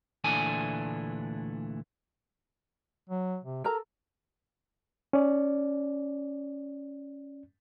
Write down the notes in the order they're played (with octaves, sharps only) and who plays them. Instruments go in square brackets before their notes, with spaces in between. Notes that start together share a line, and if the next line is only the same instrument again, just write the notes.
[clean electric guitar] D2 A#2 E3 A3 D4 G#5
[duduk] F#3
C3
[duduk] A4 [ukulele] A#4 A#5
[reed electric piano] C#4 D5